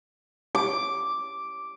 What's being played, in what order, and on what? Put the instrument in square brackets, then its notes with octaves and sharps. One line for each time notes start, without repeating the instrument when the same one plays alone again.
[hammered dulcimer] D6